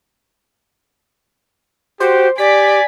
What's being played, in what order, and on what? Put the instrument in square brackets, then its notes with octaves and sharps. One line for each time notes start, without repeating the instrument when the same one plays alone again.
[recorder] F#4 [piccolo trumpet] G4 [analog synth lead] C5
[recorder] G4 [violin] D5 [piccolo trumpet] G#5 [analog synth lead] B6